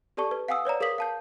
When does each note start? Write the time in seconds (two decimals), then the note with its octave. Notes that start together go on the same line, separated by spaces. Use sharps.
0.17 G4 A4 D5 A5 C#6
0.31 B4
0.48 F5 F#5 G#5 D#6 E6
0.65 B4 C#5 D5 A#5
0.80 G#4 A#4 F5 D#6 B6 F#7
0.98 F5 A5 G6